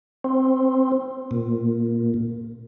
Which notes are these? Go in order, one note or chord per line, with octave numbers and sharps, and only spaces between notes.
C4
A#2